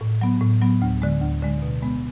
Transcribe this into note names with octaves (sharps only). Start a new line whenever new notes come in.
A2
F#3 B3
A2
F#3 B3
D2
D3 G#3
D2
D3 G#3
B2
G#3 B3